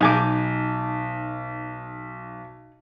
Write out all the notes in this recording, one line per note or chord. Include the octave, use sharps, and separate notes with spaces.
B1 D#4 G#5 D6